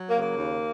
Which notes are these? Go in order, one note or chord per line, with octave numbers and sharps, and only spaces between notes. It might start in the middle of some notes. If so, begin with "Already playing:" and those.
Already playing: F#3
A#3
C#3
A#3
D#2